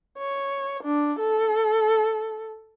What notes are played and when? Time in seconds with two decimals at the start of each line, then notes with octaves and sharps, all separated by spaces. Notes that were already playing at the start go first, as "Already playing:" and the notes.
0.18 C#5
0.83 D4
1.19 A4